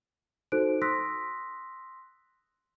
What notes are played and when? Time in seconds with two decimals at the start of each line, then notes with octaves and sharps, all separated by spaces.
0.52 D#4 F#4 A4 C5 F#6 D7
0.82 C6 D#6 E6 F#6 A#6 B6